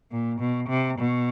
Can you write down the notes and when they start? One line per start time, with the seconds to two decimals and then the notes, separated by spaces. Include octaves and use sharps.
0.11 A#2
0.39 B2
0.69 C3
0.98 B2